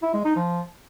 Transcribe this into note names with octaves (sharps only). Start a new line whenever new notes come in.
E4
G#3
D#4
F3